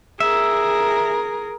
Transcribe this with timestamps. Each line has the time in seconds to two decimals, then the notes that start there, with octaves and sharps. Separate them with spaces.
0.20 G#4 A#4 E5